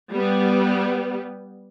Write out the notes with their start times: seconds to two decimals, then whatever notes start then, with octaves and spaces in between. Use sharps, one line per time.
0.11 G3 B3